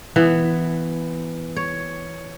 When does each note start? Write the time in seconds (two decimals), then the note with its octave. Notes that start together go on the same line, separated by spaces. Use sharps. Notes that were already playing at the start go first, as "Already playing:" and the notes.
0.16 E3 B3
1.56 C#5